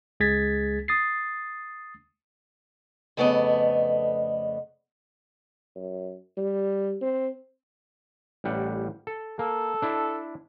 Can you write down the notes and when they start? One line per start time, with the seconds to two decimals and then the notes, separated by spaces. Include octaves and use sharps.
0.20 C#2 G#3 G#4 G#6 A6 B6
0.88 D#6 A6 C7
3.17 F2 C#3 A3 B3 D5 D#5
5.75 F#2
6.37 G3
7.01 C4
8.44 A1 G3 F#5
9.07 A4
9.39 A#3 A4
9.82 D4 E4